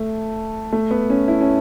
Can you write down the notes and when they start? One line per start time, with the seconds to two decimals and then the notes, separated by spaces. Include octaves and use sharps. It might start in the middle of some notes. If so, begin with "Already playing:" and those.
Already playing: A3
0.73 A3
0.91 B3
1.10 C#4
1.28 E4
1.41 C#4